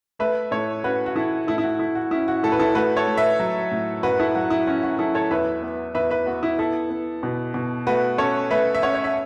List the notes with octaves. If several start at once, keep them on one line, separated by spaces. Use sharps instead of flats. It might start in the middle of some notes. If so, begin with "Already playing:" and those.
A3 B4 E5
A2 A4 C#5
C#4 F#4 B4
F#4
E3 E4 A4
A2 E4 A4
E4
F#4
A3 E4
F#4
C#4 E4
F#4
A2 E4 A4
B4
E4 A4
A3 F#4 B4
A4 C#5
A3
B4 E5
F#3
A2
F#2 F#4 B4
E4 A4
F#3 F#4
E4
C#4 F#4
F#4
F#3 E4 A4
A4 C#5
E2 B4 E5
B3
E2 B4 E5
B4 E5
B3 F#4
E4
B3 E4 A4
B3
B2
B2
A3 F#4 B4
C#4 A4 C#5
A3 B4 E5
E5
C#4 C#5 F#5
C#5
E5